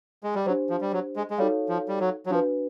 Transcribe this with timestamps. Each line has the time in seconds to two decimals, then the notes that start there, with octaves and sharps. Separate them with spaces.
0.23 G#3
0.35 G3
0.46 F#3 D4 G4 C5
0.70 F3
0.81 G3
0.93 F#3
1.16 G#3
1.30 G#3
1.38 G3 D#4 F#4 A4 C#5 F5
1.69 F3
1.88 G3
2.00 F#3
2.26 F#3
2.30 F3 D4 F#4 B4